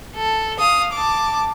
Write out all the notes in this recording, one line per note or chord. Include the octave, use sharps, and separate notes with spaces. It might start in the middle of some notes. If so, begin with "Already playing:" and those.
A4
F5 D#6
A5 D6